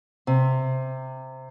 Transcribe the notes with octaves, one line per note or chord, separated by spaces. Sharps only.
C3